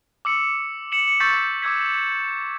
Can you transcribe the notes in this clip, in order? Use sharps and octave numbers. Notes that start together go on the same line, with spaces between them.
D6 E6 C#7
C#7 E7 F#7
C#7
C#6 E6 G6 A6 B6
D6 E6 G#6 B6